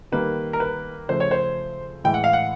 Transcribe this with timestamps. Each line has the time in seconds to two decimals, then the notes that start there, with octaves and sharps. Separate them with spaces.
0.12 D#3 G3 A#3 B4
0.53 A#4
0.60 B4
1.08 C#3 F3 A3 C5
1.20 C#5
1.31 C5
2.04 A2 E3 G#3 G5
2.14 F#5
2.24 F5
2.33 F#5